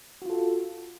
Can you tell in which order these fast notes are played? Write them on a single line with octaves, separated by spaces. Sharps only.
F#4 F4 A4